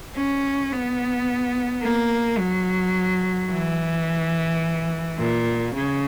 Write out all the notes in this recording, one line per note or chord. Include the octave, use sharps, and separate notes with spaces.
C#4
B3
A#3
F#3
E3
A#2
C#3